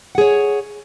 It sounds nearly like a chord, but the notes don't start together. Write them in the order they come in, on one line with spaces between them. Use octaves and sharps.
F#5 G#4 C#5